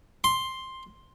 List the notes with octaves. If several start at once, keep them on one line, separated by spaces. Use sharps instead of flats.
C6